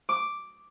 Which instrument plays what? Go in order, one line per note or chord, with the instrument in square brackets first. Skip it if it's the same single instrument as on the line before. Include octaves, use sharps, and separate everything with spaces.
[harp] D6